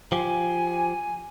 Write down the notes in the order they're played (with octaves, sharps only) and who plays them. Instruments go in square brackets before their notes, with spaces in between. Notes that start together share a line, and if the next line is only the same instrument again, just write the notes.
[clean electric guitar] F3 G4 [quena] G#5